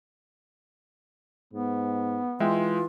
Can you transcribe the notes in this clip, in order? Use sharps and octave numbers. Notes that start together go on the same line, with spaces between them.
G#2 B3
E3 G#3 F4 E5 G5